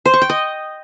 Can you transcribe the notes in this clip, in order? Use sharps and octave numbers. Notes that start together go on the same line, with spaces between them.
C5
C#6
G5
D#5